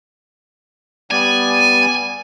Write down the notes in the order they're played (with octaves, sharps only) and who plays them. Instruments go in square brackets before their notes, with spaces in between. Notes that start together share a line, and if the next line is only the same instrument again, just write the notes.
[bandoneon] G3 B3 D5 [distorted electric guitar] G#5